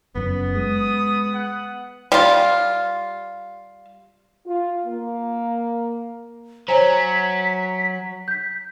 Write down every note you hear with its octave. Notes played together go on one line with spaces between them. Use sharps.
F#1 F#2 B3
G#3 D#6
F#5
G3 F4
F4
A#3
F#3 C5 C#5 G#5 A#5 B6
G6 B6